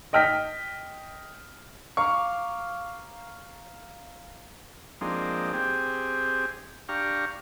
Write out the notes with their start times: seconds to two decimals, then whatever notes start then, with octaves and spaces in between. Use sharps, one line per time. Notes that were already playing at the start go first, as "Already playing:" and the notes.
0.13 D#5 G5 F6 A#6 B6
1.97 F5 A#5 C#6 D6
5.01 F3 G#3 A#3 C4 D4 D#4
5.53 C4 G4 G#4
6.89 D4 G4 F5 A#5 C#6